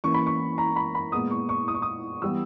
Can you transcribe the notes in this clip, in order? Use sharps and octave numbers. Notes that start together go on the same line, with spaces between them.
E3 A#3 C#4 C#6
B5
C#6
A#5
B5
B5
A#2 G#3 B3 D#6
C#6
C#6
D#6
C#6
D#6
E3 G3 B3 E6